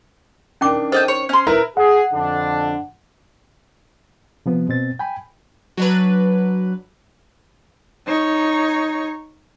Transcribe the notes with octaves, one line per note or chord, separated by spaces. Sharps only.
D#3 C#4 D4 G5 D6
A4 C5 D#5 G5
C#5
C#4 C6
E4 A#4 B4 A#5
G#4 F#5
F2 D3 D4
C3 F3 B3
B2 C4 A6
G5 G#5 B5
F#3 D4 B4
D#4 C#5